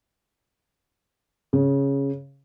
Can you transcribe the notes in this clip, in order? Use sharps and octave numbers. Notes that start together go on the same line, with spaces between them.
C#3